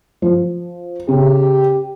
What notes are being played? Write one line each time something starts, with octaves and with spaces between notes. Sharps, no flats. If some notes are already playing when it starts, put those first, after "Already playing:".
F3
C#3 G4